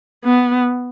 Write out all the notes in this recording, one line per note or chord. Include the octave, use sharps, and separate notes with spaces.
B3